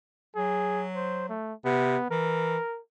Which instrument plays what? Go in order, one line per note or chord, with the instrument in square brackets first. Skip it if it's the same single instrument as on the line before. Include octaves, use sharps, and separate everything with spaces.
[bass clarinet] F#3 [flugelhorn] G#4
[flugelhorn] C5
A3
[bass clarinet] C3 [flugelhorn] B3
[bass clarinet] E3 [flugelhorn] A#4